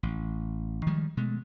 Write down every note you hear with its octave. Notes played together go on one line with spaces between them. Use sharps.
A1
D#3 F3 G3 G#3
B2 G#3 A3